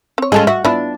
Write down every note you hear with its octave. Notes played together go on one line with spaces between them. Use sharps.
C4 C#5
G#3 C#4 F4 G#4 A4
F#4 E5
B3 D4 E4 F4